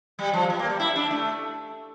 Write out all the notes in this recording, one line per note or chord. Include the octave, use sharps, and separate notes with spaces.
G3
F3
G3
A#3
G3
E4
D4
A3